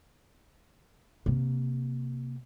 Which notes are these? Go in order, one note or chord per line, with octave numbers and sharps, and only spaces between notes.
C3 A#3